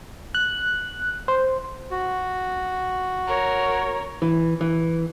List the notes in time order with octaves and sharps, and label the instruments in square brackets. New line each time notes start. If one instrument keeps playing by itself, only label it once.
[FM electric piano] F#6
C5
[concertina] F#4
[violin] A#4 C#5
[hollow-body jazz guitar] E3
E3